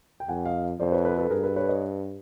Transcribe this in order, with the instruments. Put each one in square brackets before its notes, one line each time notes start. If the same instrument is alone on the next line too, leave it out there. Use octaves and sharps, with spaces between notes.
[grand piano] G5
[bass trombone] F2 [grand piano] F#5 G#5
[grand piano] D#5 F5
[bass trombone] F2 [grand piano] C5 D5
[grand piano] B4 C#5
A4 B4
A4 B4
[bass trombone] G2 [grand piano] G#4 A#4
[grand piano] A4 B4
B4 C#5
C#5 D#5